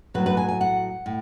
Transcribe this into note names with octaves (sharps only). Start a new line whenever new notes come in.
A2 F#3 A3 B4
B4
G#5
G#5
F#5
A2